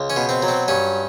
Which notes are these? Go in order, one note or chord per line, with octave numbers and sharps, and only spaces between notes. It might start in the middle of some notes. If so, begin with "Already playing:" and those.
Already playing: C#2
C#4
B2
C4
F#3
C4
G2 C#4